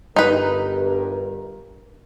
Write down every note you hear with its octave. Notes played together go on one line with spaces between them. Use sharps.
G1 G2 D#4 A#4 B4